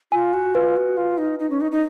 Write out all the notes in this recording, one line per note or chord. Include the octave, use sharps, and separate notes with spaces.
F4 G#5
F#4
F4 B4
F#4
F4
D#4
D#4
C#4
D#4
D#4